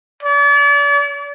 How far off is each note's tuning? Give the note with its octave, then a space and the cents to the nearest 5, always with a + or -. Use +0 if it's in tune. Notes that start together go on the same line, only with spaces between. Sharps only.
D5 -40